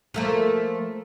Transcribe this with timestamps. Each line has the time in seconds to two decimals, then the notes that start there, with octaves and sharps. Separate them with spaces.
0.14 F3 A3 A#3